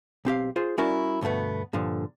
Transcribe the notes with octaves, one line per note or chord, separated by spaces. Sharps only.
B1 C4 G4 F5
F4 G#4 C5
G3 C#4 E4 F#4 A#4 D5
D2 G2 B2 A3 B3
G2 A#2 D3 F3